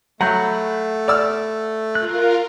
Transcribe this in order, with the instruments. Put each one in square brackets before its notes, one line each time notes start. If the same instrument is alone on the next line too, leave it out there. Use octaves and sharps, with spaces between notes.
[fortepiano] F#3 [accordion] A3 [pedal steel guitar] F#5 B5 G6
[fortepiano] D5 E6 F6
[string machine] F4 A#4 [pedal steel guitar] F#6